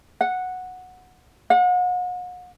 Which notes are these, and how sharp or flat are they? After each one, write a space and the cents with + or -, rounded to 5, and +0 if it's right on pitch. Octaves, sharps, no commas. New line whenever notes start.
F#5 -10
F#5 -40